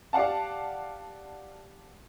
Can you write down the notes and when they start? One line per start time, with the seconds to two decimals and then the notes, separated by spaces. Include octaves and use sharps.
0.13 G4 D5 F5 F#5 A5